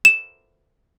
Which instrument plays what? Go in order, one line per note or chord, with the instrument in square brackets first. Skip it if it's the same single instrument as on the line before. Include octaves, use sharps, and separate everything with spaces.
[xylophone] E7